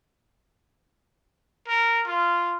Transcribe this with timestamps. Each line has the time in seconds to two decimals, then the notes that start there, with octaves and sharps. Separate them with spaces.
1.68 A#4
2.06 F4